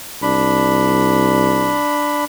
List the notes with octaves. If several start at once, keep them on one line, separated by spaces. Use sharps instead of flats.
C2 D4 B5